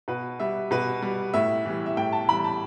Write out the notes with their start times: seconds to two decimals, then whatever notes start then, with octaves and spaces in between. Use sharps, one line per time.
0.08 B2 B4
0.40 G3 E5
0.71 B2 B4
1.02 G3
1.34 A2 E5
1.65 E3 G3
1.86 E5
1.97 A2 G5
2.12 A5
2.29 E3 G3 B5
2.44 A5